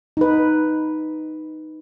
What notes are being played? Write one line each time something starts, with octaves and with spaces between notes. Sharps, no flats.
D#4 B4